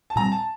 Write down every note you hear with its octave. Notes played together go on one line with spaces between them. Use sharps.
A5
A#2 G3 C4 A#5
A5